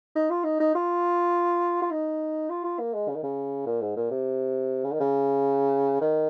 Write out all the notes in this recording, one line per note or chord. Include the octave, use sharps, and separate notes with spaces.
D#4
F4
D#4
D#4
F4
F4
D#4
F4
F4
A#3
G#3
C#3
D#3
C#3
A#2
G#2
A#2
C3
C#3
D#3
C#3
D#3